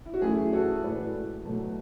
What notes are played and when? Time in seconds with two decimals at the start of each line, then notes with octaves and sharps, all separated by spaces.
0.06 E4
0.14 F#4
0.22 F#2 E3 A3 E4 G#4
0.53 F#4 A4
0.84 A2 E3 G#3 B4 D5
1.45 B2 F#3 A3